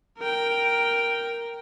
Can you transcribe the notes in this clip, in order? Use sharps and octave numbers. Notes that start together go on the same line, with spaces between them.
A#4 G5